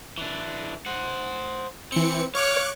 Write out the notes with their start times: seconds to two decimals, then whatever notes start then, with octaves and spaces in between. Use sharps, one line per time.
0.18 E3 D4
0.86 C5 F#5
1.92 E3 C4 C#7
2.35 C#5 F5 C#6 D6 F#6